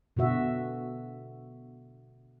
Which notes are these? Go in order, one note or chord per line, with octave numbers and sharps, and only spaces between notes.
B2 D3 F#4 E5